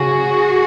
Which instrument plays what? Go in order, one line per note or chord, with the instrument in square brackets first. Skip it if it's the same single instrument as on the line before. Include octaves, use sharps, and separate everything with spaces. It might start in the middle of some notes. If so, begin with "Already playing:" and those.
Already playing: [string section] C#3 F#4 G#4